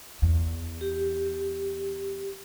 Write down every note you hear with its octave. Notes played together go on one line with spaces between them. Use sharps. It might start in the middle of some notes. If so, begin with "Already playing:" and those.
E2
G4